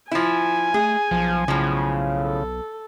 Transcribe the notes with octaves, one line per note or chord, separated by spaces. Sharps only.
F3 E4 G#5
A3 G#4
B1 F3
A2 C#3 F3
A4